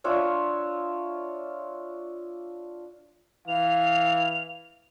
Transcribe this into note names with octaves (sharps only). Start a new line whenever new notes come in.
D4 F4 C#5 E5
E3 F5 F7